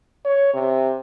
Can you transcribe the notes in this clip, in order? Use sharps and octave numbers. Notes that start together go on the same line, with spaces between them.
C#5
C3